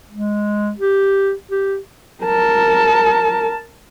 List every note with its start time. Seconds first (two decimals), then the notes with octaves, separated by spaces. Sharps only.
0.11 G#3
0.78 G4
1.51 G4
2.24 A#4 A5